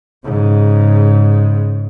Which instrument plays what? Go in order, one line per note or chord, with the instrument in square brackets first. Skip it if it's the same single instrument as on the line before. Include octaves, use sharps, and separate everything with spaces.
[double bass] G#2 C#3